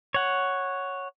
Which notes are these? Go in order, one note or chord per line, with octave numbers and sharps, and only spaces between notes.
C#5 F#5